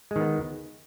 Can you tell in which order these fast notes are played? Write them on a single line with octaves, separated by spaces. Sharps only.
G#3 D#3 B3